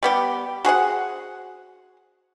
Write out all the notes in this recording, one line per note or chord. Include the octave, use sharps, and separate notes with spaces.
G3 B3 G4
F#4 G#4 C5 F#5